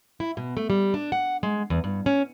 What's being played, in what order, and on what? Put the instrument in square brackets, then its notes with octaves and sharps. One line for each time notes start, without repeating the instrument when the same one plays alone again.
[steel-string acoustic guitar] E4
B2
A3
G3
D4
F#5
G#3
E2
G2
C#4